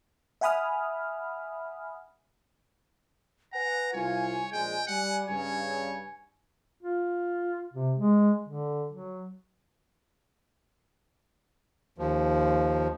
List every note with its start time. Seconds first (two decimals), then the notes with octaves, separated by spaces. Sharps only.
0.41 E5 F#5 G#5 B5 D#6 F6
3.53 B4 F#5 G#5 A#5
3.93 C2 G3 F4 C#5
4.52 A#1 G#3 G5
4.87 G3 F#5
5.28 G2 C#3 C#5
6.83 F4
7.74 C3
7.97 G#3
8.48 D3
8.91 F#3
11.98 D#2 F3